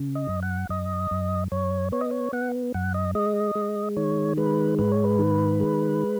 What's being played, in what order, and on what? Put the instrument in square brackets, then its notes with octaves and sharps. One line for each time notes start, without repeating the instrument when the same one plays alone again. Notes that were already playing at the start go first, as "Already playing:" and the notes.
Already playing: [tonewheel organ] C#3
D#5
F#2
F#5
F#2 D#5
F#2
F#2 C#5
B3 C#5
D#5
C#5
B3 F#5
F#2 F#5
D#5
G#3 D#5
G#3
D#3 C#5
G#3 B4
G#2 B4
C#5
B4
D#3
G#3